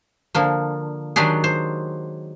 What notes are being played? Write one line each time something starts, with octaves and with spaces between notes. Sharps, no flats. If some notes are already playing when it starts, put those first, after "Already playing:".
D3 F3 A#3
D#3 F#3 G#3 D4 G4 G#4
C5